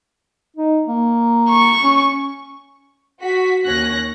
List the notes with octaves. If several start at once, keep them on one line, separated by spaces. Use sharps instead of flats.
D#4
A#3
C#6
C#4
F#4 B6
D#2 C#4 F#6 A#6